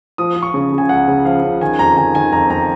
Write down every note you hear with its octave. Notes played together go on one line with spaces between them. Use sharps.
F3 D#6
F3
C#6
C#3
C#3
G#5
C#2 F#5
C#3
F3 F5
C#3
D#3 G#5
F2 A#5
D#3 G#5
D#3 G#5
F2 A#5
F2 A#5